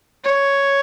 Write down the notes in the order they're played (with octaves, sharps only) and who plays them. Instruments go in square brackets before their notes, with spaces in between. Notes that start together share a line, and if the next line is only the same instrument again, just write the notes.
[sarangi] C#5